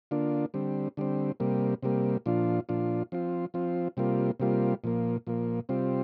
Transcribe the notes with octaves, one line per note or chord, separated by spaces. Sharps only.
D3 A#3 D4 F4
D3 G3 C4
D3 G3 C4
C3 G3 A#3
C3 G3 A#3
A#2 F3 D4 F4
A#2 F3 D4 F4
F3 C4 F4
F3 C4 F4
C3 G3 A#3 F4
C3 G3 A#3 F4
A#2 F3 A#3
A#2 F3 A#3
C3 G3 C4 F4